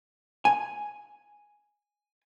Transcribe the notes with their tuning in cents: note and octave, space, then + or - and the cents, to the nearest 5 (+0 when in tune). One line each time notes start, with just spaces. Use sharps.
G#5 -5